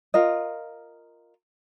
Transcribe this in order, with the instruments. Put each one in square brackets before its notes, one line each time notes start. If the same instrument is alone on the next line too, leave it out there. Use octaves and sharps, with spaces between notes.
[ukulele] F4 A#4 D#5